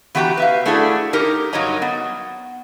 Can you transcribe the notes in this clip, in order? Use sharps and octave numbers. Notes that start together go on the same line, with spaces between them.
E3 B3 F#4 G4 G5 A#5
B4 E5 F5
A3 D4 E4 F#4 G#4 A4
D#4 G4 A#4
G2 F#3 D#4 C#5 D#5 A#5
B3